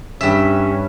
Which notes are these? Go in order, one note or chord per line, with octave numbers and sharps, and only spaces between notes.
G2 C#4 E5